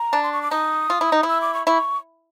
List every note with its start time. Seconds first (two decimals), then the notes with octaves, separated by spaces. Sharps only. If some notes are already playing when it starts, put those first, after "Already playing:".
Already playing: A#5
0.13 D4
0.23 C6
0.33 C#6
0.42 D6
0.51 D#4 D#6
0.90 F4
1.01 E4
1.12 D#4
1.23 E4 E6
1.41 D6
1.54 C#6
1.67 E4 C#6